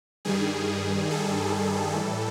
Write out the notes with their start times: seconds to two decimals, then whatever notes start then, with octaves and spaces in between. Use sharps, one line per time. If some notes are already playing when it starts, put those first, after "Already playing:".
0.25 G2 D#3 G3 G#4
1.11 A4
1.96 A2 E3 G3